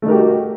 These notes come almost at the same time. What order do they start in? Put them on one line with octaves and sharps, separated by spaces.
A3 D#4 A#4 G4 F#4